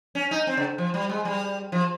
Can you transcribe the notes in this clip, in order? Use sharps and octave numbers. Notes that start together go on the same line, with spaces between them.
C#4
D#4
C4
C#3
F3
G3
G#3
G3
F3